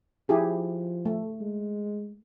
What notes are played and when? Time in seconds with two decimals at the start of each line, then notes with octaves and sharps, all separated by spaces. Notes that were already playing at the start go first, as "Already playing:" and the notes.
0.29 F3 E4 G4 G#4
1.06 A3
1.40 G#3